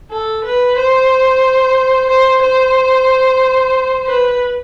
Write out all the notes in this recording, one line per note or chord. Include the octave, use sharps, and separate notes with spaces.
A4
B4
C5
C5
C5
B4